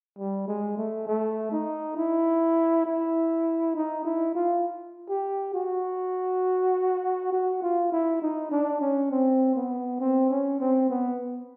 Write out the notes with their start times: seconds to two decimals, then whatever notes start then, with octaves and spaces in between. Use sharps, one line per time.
0.18 G3
0.48 G#3
0.77 A3
1.07 A3
1.52 D#4
1.96 E4
2.86 E4
3.75 D#4
4.05 E4
4.35 F4
5.09 G4
5.54 F#4
7.32 F#4
7.62 F4
7.92 E4
8.22 D#4
8.51 D4
8.81 C#4
9.11 C4
9.55 B3
10.00 C4
10.30 C#4
10.60 C4
10.90 B3